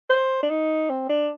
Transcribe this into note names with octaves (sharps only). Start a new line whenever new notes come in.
C5
D4
D#4
C4
D4